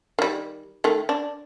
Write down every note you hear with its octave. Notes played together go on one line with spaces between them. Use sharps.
D#3 G3
D#3 A3
D4